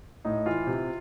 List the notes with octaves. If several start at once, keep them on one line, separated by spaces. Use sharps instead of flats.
A2 D#4
E3 F4
C3